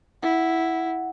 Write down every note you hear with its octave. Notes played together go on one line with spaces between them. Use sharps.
E4 F#5